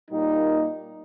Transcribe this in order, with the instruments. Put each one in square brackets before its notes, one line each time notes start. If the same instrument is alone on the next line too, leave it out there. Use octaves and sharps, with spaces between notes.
[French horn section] A#2 G3 A#3 D#4